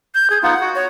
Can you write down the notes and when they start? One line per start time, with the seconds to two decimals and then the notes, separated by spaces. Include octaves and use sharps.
0.14 G6
0.30 G#4
0.43 B3 D#4 F4 F#5
0.61 F#4
0.75 C#5